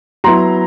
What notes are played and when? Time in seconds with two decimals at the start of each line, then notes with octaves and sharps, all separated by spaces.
0.24 F#3 B3 E4 A#5 C6